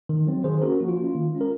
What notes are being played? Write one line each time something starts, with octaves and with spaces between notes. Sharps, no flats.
D#3
F#3 C4
D#3 G#4 C5
A#3 C#4 F#4 A#4
F3 F#4
F4
A#3 C#4
F4
D#3
G#3 C#4
A#4